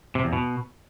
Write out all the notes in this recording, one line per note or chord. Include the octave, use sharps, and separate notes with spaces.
C3
E2
B2